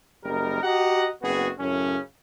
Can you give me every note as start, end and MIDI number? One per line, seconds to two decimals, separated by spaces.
0.24 0.63 30
0.24 0.63 55
0.24 0.63 63
0.24 0.63 70
0.64 1.09 66
0.64 1.09 67
0.64 1.09 75
0.64 1.09 78
0.64 1.09 82
1.23 1.49 30
1.23 1.49 59
1.23 1.49 60
1.23 1.49 66
1.23 1.49 68
1.60 1.98 42
1.60 1.98 45
1.60 1.98 49
1.60 1.98 61